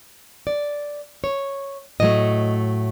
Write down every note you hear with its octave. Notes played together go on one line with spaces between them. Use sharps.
D5
C#5
A2 F#3 A3 D#5